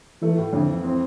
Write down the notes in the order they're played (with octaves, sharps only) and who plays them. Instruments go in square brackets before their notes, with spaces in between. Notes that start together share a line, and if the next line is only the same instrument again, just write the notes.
[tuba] E3 [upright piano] A3
[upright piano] A2
[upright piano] F2 [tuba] D3
[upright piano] E3
C4